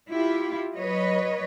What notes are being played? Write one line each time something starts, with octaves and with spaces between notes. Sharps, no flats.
E4 F4 G4
F#3 B4 C#5 D#5